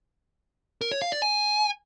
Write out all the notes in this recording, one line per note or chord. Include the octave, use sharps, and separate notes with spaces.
A#4
C#5
F5
D5
G#5